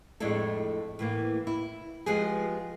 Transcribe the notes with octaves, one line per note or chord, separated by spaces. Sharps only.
F2 A2 G#3 D4 E4 A4
A2 E3 A#3
E4
F3 G#3 B3 G4 G#4